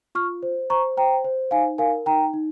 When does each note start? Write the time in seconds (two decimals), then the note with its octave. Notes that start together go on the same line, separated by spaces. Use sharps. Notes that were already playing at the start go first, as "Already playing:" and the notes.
0.15 F4 C#6 F6
0.43 C5
0.70 C5 A#5 C#6
0.97 C5 G5 A#5
1.24 C5
1.51 D#4 F5 G#5
1.78 A#4 F5 G#5
2.06 D#4 G5 A#5
2.33 D#4